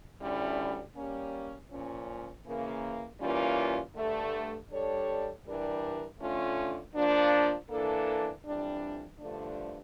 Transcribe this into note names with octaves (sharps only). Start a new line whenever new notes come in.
D2 D3 G3 C#4 E4
G3 A#3 C#4
A#2 F3 C#4
C#3 E3 A#3
E3 G3 A#3 C#4 F4
G2 D3 A3
G3 D4 A4 C#5
E3 G3 D4 G4 A#4
D3 A3 C#4 F4
F3 A#3 D4
E3 A#3 D4 A4
F2 E3 G3 D4
G2 D3 F3 A3 D4